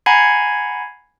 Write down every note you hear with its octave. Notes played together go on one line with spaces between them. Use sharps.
F#5 G#5 A#5 B5 G#6 C7